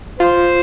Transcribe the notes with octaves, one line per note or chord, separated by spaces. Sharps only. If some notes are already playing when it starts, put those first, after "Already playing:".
F4 C5